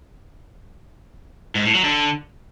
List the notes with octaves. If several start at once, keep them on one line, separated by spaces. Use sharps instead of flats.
G#2
A2
F#3
D3